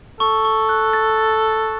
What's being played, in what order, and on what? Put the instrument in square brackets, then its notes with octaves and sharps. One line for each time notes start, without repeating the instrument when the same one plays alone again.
[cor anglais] A4 [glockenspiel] C#6
[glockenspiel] C#6
F#6
A6